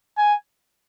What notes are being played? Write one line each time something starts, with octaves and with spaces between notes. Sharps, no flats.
G#5